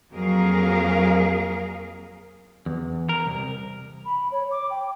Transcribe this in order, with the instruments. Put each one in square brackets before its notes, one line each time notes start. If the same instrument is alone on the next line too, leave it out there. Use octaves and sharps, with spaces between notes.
[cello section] F2 F#3 A#3 G#4 A#4 F5
[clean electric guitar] E2
A#4
C2
[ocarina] B5
C#5
D6
G5